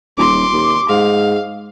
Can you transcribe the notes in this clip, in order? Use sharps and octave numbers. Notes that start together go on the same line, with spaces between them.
D#1 C6 D6
D#2
G#2 F5